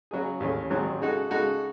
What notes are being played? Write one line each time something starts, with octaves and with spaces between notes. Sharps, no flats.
C#3 F#3 C#4 G#4
D#2 C#3 E3 A3 C#4
A1 G#2 D#3 F#3 C4
C#3 G#3 D#4 F#4 A4
C#3 G#3 D#4 F#4 A4